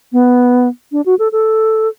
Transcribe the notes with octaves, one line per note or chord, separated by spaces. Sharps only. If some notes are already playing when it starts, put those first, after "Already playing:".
B3
D4
F#4
A4
A4